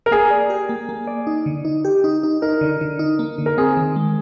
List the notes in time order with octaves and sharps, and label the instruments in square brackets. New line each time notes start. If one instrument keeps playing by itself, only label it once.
[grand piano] A#4
[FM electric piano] A#3 [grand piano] G#4
[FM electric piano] D5
G4
A#3
A#3
D5
D#4
D3
D#4
G4
D#4
D#4
[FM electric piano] D#4 [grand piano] A#4
[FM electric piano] D3
D3
D#4
A#3
D3
[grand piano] A#4
[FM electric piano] C4 [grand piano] G#4
[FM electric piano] D#3
G#3